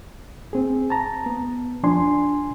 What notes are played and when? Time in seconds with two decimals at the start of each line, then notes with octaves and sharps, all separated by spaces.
0.53 C4 G#4
0.90 A5 A#5
1.26 B3
1.83 F2 F3 D4 G#5 C6